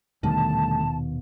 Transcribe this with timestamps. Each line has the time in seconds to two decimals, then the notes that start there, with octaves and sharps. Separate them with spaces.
0.23 D#1 B2 D3 D#3 G3 A3 A5